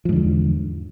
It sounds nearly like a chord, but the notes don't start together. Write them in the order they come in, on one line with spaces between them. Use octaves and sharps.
F3 G#2 D3 E2